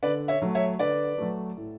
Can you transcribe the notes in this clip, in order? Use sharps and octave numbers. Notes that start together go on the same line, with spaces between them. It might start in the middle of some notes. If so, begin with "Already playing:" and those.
D3 B4 D5
C#5 E5
F#3 A3
C#5 E5
D3 B4 D5
F#3 A3
A2